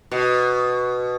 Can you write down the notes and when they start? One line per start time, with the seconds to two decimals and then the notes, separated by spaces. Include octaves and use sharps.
0.11 B2